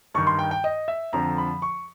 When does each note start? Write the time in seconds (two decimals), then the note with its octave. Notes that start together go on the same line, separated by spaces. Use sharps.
0.14 G2 D#3 C#6
0.27 C6
0.39 G5
0.51 G5
0.64 D#5
0.88 E5
1.13 F2 D3 F3 A#5
1.38 B5
1.62 C#6